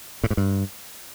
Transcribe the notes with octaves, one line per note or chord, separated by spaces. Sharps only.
A2
G#2
G2